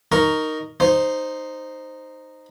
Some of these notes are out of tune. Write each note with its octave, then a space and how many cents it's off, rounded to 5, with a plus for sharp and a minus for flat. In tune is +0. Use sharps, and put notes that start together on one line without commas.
D#4 +0 A#4 +0 C#6 +5
D#4 -10 C5 +0